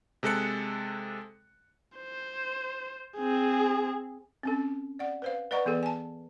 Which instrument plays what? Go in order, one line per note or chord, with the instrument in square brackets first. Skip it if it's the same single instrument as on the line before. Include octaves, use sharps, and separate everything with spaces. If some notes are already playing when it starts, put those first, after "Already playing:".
[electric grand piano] C3 G#3 A4 F#6 C#7
[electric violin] C5
C4 G#4
[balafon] C4 C#4 A4
D5 F#5
B4 C5 F5
B4 D5 D#5 F#5 A#5 C#6
E3 B3 G#4 A4 D5
G#5 A5